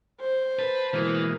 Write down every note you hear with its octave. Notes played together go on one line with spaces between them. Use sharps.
C5
B4 A5
B2 E3 G#3 A#3